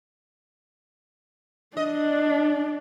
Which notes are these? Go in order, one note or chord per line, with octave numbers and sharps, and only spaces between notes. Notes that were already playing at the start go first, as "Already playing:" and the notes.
D4 D#5